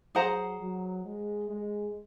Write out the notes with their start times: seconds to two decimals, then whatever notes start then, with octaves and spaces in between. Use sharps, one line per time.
0.15 F#3 G#4 C5 F#5 A#5
0.60 F#3
1.05 G#3
1.49 G#3